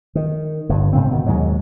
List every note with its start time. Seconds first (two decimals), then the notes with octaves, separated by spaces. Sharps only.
0.15 D#3
0.69 G1 G2
0.93 G#2 C#3 C4
1.11 B2 D#3
1.26 D#2 G#2 F#3 G#3